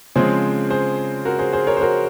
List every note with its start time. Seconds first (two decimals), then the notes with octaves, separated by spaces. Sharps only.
0.16 C#3 F3 G#3 C4 G#4 C5
0.70 G#4 C5
1.25 F#4 A#4
1.39 G#4 C5
1.53 G#4 C5
1.67 A#4 C#5
1.77 C5
1.81 F#4 A#4